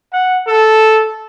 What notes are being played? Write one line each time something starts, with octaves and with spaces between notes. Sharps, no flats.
F#5
A4